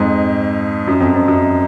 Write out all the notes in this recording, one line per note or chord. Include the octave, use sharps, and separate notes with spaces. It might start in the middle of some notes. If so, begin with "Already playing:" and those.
Already playing: F2 G#2
F#2
F2
F2
F#2